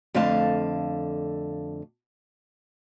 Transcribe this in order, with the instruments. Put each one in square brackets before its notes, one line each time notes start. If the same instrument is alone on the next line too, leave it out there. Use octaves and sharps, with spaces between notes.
[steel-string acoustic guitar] F2 D3 A3 F5 A5